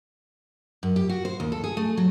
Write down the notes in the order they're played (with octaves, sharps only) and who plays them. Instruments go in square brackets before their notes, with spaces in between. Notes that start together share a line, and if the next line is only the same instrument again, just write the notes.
[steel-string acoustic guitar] F#2
G4
F#4
C5
D#2
A4
G#4
A3
F#3